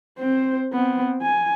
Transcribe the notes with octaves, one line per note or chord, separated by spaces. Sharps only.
C4 C5
B3 C4
G#5